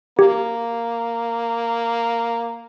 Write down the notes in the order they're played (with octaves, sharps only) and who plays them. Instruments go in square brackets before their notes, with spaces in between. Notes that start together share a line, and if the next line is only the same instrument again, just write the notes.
[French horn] A#3 [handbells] G4